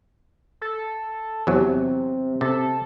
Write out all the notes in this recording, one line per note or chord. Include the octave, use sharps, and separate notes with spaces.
A4
E2 C3 F#3
C3 A4